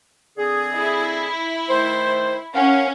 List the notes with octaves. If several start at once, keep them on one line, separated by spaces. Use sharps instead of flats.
D3 C4 G#4
E4
D#3 A3 C5
C#4 A#4 F5 F#5